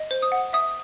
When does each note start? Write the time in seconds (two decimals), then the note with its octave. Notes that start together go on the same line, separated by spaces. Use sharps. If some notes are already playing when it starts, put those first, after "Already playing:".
Already playing: D#5
0.11 C5
0.22 D#6
0.32 F#5
0.53 E5 D#6